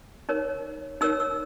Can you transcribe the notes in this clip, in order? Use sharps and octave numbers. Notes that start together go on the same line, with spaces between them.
D#4 A#4 C#5
D#4 A#4 C#5 E6
E6